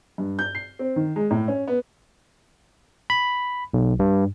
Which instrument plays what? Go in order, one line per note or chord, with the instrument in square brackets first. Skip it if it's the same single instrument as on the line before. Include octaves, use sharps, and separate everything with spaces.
[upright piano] G2
G6
C7
C4
D#3
G#3
A2
C#4
B3
[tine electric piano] B5
B1
G2